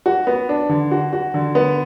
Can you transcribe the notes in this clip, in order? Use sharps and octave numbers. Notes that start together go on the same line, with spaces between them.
F#4
B3
D4
D3
F#4
F#4
D3
B3